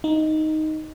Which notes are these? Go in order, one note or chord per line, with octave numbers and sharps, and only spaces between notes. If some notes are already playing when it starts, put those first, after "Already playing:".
D#4